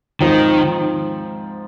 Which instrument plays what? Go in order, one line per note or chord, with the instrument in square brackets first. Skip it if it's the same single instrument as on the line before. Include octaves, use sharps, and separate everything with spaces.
[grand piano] G#2 F3 C4 [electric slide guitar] D#3